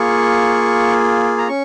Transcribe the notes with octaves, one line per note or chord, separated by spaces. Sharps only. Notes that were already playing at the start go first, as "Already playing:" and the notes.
Already playing: A#3 F4 G#4 C#6
A#5
C#4 C#6